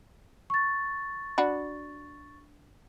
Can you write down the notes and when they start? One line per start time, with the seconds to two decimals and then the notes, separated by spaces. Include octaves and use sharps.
0.50 C#6 A6
1.38 D4 F#4 B5